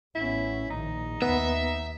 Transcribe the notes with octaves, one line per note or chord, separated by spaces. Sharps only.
A1 B3 C#4 E4
A#1 A#2 D#3 D#4
D#2 B3 E5